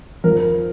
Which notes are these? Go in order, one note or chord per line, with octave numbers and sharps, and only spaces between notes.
F2 A#4